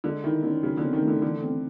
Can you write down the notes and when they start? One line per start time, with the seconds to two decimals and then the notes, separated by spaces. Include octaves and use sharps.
0.04 D3 G#3
0.24 D#3 E4
0.43 D3 C#4
0.63 C#3 F#3
0.77 D3
0.83 C4
0.93 D#3
1.02 A3
1.08 D3
1.22 D3 E3
1.43 C4